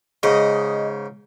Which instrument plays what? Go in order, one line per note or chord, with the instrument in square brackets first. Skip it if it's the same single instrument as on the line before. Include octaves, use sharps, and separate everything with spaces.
[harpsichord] G#2 C#3 [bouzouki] D#5